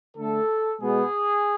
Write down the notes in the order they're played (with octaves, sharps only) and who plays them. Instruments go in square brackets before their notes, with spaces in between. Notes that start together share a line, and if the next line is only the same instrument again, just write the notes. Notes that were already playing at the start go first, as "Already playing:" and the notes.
[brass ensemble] D3 A3 A4
B2 G#3 B3 G#4